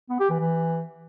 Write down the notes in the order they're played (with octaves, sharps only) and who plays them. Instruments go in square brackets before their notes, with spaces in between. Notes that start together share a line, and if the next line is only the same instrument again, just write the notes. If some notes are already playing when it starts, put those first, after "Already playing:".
[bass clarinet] B3
G4
E3
E3